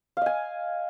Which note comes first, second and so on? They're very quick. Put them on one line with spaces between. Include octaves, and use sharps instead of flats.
F5 D#5 G#5